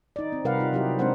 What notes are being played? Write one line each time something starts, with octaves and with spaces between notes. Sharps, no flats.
D#4 D5
C4
C3 G3 A#4 B4 F5 F#5
D#4 F4
F#3 D#4 E4 G4
G#3 C4 D4 D#4 C5 F#5